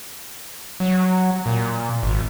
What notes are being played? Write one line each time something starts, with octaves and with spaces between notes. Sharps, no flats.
F#3
A#2
G#1